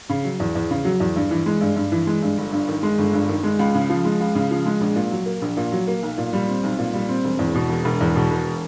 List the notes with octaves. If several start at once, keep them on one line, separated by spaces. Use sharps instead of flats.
C#3
F#3
E2
E2
C#3
F#3
E2
G2
E3
G#3
G2
G2
E3
G#3
G2
G1
G2
D#3
G#3
G1
G2
D#3
G#3
C#2
C#3
F3
G#3
C#2
C#3
F3
G#3
A#1
A#2
F#3
A#3
A#1
A#2
F#3
A#3
B1
A#2
G3
C4
B1
A#2
G3
C4
E1
E2
B2
E1
E1
E2
B2
E1